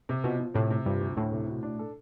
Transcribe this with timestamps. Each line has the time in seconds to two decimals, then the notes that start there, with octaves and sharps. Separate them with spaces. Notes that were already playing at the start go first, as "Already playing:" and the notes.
0.09 C3
0.24 B2 F3
0.40 F3
0.54 A2 C3
0.71 C3
0.86 G2 F3
1.01 D2
1.17 D2 A2
1.32 C3
1.48 B2
1.63 D4
1.79 A4